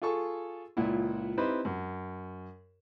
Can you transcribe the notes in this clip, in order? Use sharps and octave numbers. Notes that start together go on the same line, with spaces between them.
F4 G#4 A4 C#6
C#2 A#2 E4
C4 D#4 E4 G4 B4 C5
F#2